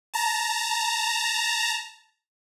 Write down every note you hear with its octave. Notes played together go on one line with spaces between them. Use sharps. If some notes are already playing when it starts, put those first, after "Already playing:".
A5 A#5